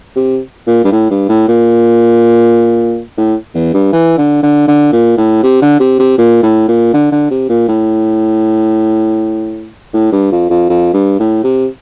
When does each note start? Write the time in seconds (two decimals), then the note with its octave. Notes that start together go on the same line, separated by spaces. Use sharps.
0.16 C3
0.67 A#2
0.84 G2
0.92 A2
1.11 G2
1.29 A2
1.48 A#2
3.18 A2
3.55 E2
3.74 G2
3.93 E3
4.18 D3
4.43 D3
4.68 D3
4.92 A#2
5.18 A2
5.43 C3
5.62 D3
5.80 C3
5.99 C3
6.18 A#2
6.43 A2
6.68 A#2
6.93 D3
7.12 D3
7.31 C3
7.49 A#2
7.68 A2
9.94 A2
10.12 G2
10.32 F2
10.50 F2
10.69 F2
10.94 G2
11.20 A2
11.44 C3